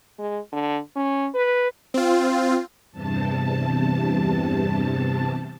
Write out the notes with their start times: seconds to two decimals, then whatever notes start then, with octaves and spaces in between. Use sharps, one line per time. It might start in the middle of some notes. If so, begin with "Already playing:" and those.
0.19 G#3
0.52 D3
0.96 C#4
1.34 B4
1.94 C4 F4
2.92 E2 G2 C3 A5